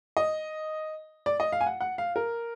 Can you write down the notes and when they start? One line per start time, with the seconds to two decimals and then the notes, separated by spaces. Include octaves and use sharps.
0.17 D#5
1.26 D5
1.40 D#5
1.52 F5
1.61 G#5
1.67 F#5
1.81 F#5
1.98 F5
2.16 A#4